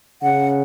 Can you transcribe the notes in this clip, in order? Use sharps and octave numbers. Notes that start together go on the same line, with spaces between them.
C#3 F#5